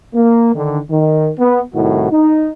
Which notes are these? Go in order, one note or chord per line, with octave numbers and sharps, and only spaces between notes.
A#3
D3 D#3
D#3
B3
C2 A2 D#3 F#4
D#4